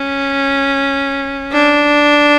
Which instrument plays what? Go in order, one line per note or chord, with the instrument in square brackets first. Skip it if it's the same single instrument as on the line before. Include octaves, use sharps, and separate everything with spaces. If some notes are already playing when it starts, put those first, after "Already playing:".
Already playing: [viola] C#4
D4